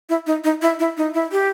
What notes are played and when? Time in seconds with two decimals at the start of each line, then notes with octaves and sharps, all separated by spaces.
0.09 E4
0.27 D#4
0.44 D#4
0.62 E4
0.79 E4
0.97 D#4
1.14 E4
1.32 G4